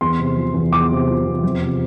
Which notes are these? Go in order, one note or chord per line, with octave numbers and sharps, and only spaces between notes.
E2 C6
C3
F3
E2
E2 D6
C3
F3
E2
F2
C3